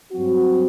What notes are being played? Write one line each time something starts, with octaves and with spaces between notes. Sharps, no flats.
G2 F#3 C4 F#4